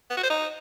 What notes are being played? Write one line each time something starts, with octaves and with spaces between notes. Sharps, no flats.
B3
F#4
C5
D#4